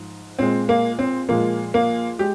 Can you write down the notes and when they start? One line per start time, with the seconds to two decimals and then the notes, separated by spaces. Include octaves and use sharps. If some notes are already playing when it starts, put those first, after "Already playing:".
Already playing: G#2 F3
0.39 A#2 G#3 C4
0.69 A#3
0.99 C4
1.29 A#2 F3 G#3 A#3
1.74 A#3
2.19 G#3 G4